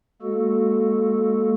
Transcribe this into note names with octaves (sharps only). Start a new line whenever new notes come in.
G#3 A#3 F#4 A4